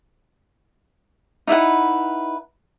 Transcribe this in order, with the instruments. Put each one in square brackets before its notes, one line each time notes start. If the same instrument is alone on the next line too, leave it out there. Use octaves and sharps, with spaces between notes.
[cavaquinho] D#4 E4 B4 F#5